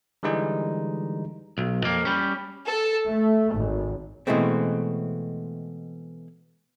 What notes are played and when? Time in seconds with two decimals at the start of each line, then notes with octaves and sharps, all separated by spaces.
0.23 D3 E3 G3 G#3 D#4
1.58 B1
1.84 F2 A#3
2.05 G3 C#4
2.65 A4
3.08 A3
3.54 G#1
4.27 B2 E3 G#3 A3 C4